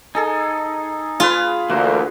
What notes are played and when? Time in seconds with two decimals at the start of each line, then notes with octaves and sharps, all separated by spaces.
0.15 D#4 G#4 A4 G#5
1.20 F4 G#4 B4
1.70 D2 E3 A3 A#3 F#4 C5